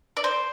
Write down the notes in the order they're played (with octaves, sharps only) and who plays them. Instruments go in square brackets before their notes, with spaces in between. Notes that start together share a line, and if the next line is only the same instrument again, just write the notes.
[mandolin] D5
C5